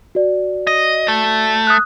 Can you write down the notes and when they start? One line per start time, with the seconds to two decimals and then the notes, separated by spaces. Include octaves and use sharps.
0.15 F#4 D5
0.67 D#5
1.08 A3
1.67 D#6 F#6